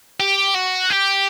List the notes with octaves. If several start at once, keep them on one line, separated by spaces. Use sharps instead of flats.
G4
F#4
G4